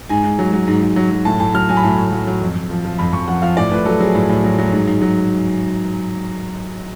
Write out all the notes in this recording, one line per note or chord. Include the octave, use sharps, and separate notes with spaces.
G#2 G#5
G#2
F#3
F#3
G#2
G#2
F#3
F#3
A2 A5
A2 A5
F#3 F6
F#3 G#5
B5
A2 A5
A2
F#3
F#3
F2
F2
F3
F3
F2 B5
F2 C#6
F3 F#5
F3 F5
A2 D5
A2 B4
F#3 A4
F#3 G#4
A2
A2
F#3
F#3
G#2
G#2
F#3